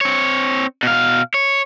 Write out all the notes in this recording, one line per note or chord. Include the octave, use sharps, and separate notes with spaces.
C4 C#5
B2 F5
C#5